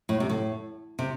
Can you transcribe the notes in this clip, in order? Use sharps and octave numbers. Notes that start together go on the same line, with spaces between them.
A2
C3
A2
C3